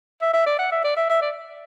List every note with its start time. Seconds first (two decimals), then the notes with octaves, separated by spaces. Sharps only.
0.21 E5
0.33 E5
0.46 D5
0.59 F#5
0.72 E5
0.84 D5
0.96 E5
1.09 E5
1.21 D5